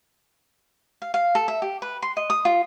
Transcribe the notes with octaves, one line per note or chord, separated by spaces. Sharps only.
F5
F5
A4
E5
G4
B4
C6
D#5
D#6
F4